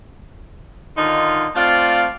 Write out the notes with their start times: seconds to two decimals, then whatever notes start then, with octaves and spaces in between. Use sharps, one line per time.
0.97 D3 D#3 D#4 F4
1.55 A3 C4 F4 D5 F5